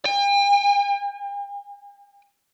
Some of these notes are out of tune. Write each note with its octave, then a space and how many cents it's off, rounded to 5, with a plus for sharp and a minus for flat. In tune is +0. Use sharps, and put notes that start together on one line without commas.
G5 +45